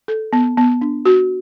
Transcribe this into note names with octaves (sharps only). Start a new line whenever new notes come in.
A4
B3
B3
D4
F#4